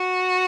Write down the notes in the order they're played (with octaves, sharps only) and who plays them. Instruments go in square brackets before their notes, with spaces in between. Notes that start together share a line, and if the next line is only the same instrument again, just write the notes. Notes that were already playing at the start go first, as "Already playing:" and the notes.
Already playing: [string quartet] F#4